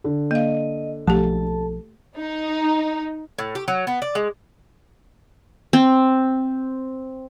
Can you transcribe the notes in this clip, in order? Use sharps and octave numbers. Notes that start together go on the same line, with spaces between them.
D3
A#3 D#5 F5
B1 F3 A3 G4 A4 A5
D#4
A2
G4
F#3
B3
D5
G#3
C4